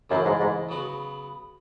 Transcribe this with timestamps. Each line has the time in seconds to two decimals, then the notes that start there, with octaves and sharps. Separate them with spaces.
0.10 F#2 C#3 E3 A3 E4
0.25 G#2
0.39 G#2
0.69 C#3 F#3 B3 F#4